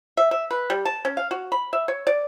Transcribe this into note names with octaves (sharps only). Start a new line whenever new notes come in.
E5
E5
B4
G3
A5
C#4
F5
F#4
B5
E5
C#5
D5